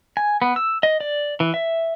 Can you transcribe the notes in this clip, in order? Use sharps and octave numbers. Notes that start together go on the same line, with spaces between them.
G#5
B3
E6
D#5
D5
E3
E5